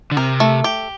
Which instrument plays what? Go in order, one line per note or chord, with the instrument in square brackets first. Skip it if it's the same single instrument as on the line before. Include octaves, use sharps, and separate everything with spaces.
[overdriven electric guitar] D3
[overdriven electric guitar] C3 [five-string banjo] A#4
[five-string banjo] A3
G4